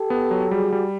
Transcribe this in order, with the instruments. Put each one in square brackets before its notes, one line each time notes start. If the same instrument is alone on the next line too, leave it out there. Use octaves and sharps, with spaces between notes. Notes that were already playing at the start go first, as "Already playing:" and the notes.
Already playing: [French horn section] G4 A4
[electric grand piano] B3
F#3
[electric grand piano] G3 [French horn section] F#4 G#4
[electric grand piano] G3